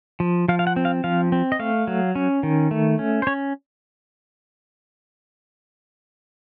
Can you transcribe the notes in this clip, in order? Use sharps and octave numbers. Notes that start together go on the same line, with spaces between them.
F3
F3 F5
F5
F#5
C4
F5
F3 F5
C4
D#5
A3 F5
F#3
C#4
D#3
A3
C#4
C5
C#4 C#5